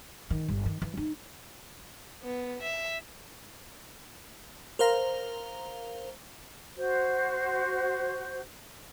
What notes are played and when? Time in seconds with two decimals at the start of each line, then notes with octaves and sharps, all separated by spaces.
0.30 D#3
0.48 G1
0.66 D#3
0.82 E3
0.97 D#4
2.23 B3
2.62 E5
4.79 A#4 C5 F5 A#5
6.75 F#4 C5